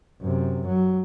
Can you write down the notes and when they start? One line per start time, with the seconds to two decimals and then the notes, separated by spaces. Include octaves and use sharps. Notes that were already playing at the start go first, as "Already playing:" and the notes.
0.22 F#2 C3
0.66 F#3